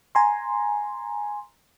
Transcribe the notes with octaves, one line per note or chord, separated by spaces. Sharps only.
G#5 A#5 C6